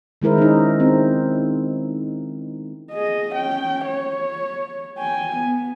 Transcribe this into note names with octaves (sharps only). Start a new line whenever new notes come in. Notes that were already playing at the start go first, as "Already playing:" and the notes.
D#3 G#3 E4 A#4 C5
C#4 D#4
C4
G#4 D#5
C#4 G5
C#5
G5 G#5
B3